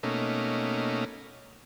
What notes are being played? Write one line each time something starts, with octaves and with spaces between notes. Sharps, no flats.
B2 A3 A#3 C#4 D#4